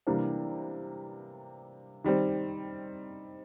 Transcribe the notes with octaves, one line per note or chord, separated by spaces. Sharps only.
C3 E3 G3 A#3 D4
D#3 G3 C4